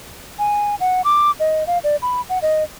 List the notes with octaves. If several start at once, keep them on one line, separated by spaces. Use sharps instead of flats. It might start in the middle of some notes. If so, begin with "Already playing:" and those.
G#5
F#5
D6
D#5
F5
D5
B5
F#5
D#5